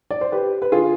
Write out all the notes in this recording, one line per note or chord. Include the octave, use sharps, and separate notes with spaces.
D5
C5
G4 B4
B4
D3 F4 G#4